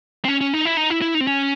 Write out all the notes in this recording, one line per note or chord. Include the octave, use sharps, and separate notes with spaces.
C4
C#4
C#4
D#4
E4
D#4
E4
E4
D#4
C4
C#4